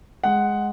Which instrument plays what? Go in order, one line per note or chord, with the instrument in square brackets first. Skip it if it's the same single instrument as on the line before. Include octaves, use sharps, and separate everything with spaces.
[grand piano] G#3 F#5